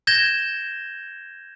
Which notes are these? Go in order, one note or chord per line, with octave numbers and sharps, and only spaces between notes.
G6 G#6 A#6 E7 G7